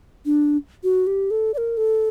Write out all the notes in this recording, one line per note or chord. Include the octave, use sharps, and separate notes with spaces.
D4
F#4
G4
A4
D5
A#4
A4